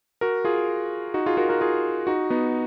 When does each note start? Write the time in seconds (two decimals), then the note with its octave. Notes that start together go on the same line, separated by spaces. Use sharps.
0.21 F#4 A#4
0.45 F4 G#4
1.14 D#4 F#4
1.26 F4 G#4
1.37 F#4 A#4
1.49 F#4 A#4
1.61 F4 G#4
2.07 D#4 F#4
2.30 B3 D#4